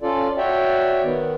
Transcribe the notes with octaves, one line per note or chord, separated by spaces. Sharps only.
C#4 F4 A4 D5
F#4 C#5 D5 E5 G5
D#3 B3